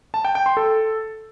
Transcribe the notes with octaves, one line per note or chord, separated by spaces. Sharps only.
A5
G5
G5
C6
A4